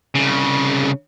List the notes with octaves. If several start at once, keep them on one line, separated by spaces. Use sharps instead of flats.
C2 C#3